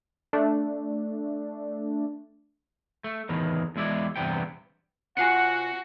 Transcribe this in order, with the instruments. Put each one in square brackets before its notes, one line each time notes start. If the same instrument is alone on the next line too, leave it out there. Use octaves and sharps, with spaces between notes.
[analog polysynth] A3 D4
[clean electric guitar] A3
E2 A2 D#3 E3
E2 G#3 E4 D5
E2 G2 C3 B3 G5
[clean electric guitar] C3 F4 G#5 [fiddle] F#4 [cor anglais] F#5 [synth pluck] C7 C#7